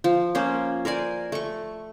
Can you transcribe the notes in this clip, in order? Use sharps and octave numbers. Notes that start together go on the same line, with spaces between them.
F3
A#3 C#4 C5
A#4 C5 D5 G#5
A3 C#6